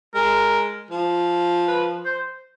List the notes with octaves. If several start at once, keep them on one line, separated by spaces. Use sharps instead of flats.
G#3 A#4
F3
B4
C5